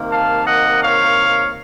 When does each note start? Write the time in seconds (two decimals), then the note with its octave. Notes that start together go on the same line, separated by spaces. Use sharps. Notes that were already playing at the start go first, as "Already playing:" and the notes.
Already playing: C3 D#3 A#3
0.10 F5 A5
0.46 D#5 F#5
0.82 C#5 F5